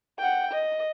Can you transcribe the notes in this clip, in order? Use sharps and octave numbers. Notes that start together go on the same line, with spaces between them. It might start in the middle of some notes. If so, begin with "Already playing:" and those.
F#5 G5
D#5